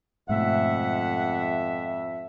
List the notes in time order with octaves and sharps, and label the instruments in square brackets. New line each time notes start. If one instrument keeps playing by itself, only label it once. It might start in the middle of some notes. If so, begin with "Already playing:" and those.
[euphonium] F2 [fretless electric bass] G#2 B2 A3 [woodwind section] E5 [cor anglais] F#5